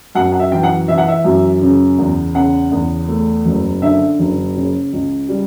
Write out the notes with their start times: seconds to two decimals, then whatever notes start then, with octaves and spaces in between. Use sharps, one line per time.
0.15 F#2 F#5
0.32 F#5
0.39 E5
0.52 E3 G5
0.63 F#5
0.88 E3 E5
0.98 F#5
1.08 E5
1.25 F#2
1.61 C#3
1.98 E2
2.35 C#3 F#5
2.72 E2
3.08 A3
3.45 F#1
3.82 D3 E5
4.19 F#1
4.56 C#3
4.93 C#2
5.29 G3